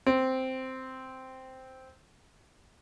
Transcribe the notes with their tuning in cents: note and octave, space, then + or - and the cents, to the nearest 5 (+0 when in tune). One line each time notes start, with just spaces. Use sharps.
C4 -5